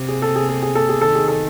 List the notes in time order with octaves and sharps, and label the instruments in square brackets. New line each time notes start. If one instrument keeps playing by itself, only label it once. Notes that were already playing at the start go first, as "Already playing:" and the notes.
Already playing: [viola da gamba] C3 [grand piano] G4
[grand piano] G#4
A4
G#4
A4
G#4
A4
G#4
[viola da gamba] D#3 [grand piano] A4
[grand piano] G#4
A4